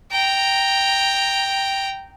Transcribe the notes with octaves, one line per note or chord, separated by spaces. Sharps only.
G5 A#5